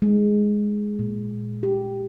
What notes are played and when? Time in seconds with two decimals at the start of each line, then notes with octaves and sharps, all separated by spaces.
0.02 G#3
0.99 A#2
1.63 G4